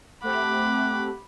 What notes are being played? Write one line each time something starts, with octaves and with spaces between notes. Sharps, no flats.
A3 C4 G4 F#5 B5 D6